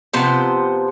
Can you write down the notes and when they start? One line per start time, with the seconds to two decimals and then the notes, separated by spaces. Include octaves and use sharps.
0.13 C3 F3 B3 C5